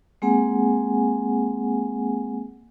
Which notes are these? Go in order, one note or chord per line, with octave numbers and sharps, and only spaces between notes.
G#3 A#3 C4 G#4 F#5 G#5